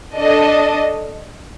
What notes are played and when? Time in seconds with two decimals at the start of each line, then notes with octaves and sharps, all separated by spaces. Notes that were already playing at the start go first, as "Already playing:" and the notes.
0.16 D4 A4 D#5